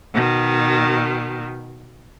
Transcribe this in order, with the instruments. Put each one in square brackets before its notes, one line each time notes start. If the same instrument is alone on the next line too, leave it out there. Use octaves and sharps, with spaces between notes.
[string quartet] B2 D#3